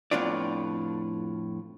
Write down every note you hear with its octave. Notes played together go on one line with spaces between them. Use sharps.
F2 A2 B3 D4 F4 D5